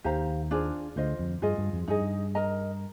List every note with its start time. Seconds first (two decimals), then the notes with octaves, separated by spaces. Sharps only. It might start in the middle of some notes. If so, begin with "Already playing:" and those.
0.04 D#2 D#3 G4 C5 F5 A#5
0.51 D4 F4 G#4 C5
0.96 D2 D3 F4 C5 D#5
1.19 F2
1.42 G2 F4 G#4 D#5
1.58 G2
1.73 F2
1.88 G2 D#4 G#4 D#5
2.35 A#4 D#5 A#5